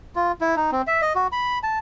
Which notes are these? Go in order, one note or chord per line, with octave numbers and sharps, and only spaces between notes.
F4
E4
D#4
C4
E5
D#5
F#4
B5
A5